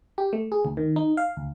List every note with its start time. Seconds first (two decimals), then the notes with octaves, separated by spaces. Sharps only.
0.18 G4
0.33 A3
0.52 G#4
0.65 D2
0.77 D#3
0.96 D#4
1.17 F5
1.37 D2